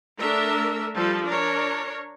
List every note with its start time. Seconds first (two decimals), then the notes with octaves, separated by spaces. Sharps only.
0.21 A3 D4 A#4 E5
0.95 F3 G3 A4
1.26 D4 A#4 C#5